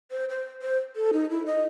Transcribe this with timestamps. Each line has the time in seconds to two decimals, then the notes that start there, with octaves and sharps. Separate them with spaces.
0.11 C5
0.29 C5
0.62 C5
0.96 A4
1.13 D#4
1.30 E4
1.46 D#5